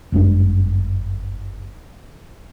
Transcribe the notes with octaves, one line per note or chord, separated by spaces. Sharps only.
G1 F#2 G#3 D4